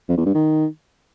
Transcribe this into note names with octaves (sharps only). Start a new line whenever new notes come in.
F2
E2
G2
D#3